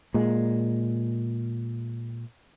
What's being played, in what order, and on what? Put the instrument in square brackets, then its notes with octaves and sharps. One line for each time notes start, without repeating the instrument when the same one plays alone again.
[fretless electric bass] A#2 G#3